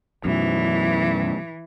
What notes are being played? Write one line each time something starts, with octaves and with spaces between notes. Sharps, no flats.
F#2 B2 E3